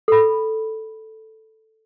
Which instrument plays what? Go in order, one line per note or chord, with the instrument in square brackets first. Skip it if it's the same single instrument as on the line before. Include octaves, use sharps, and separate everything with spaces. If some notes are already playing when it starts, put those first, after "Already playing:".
[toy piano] A4 B5